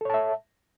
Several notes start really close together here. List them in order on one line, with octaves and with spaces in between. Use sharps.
A4 C#5 A5 E5